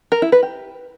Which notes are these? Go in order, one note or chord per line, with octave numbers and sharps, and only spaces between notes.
A#4
E4
B4
G4